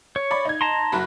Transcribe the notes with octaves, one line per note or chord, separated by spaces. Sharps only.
C#5
D5 B5
D#4 G#6
A5 A#5 C6
F#1 F#4 B5